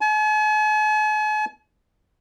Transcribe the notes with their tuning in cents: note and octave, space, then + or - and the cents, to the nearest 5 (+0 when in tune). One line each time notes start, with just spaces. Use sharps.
G#5 +45